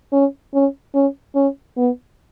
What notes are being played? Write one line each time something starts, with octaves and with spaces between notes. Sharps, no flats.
C#4
C#4
C#4
C#4
B3